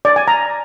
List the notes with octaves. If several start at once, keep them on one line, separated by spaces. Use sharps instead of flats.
D5
G#5
A#5